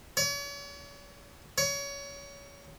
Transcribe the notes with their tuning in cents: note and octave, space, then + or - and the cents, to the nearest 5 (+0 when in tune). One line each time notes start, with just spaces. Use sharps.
C#5 +40
C#5 +25